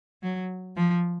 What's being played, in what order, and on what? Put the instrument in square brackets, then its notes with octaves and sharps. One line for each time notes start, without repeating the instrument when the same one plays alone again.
[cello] F#3
F3